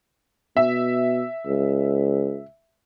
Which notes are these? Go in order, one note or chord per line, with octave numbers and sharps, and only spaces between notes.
B2 E5
C#2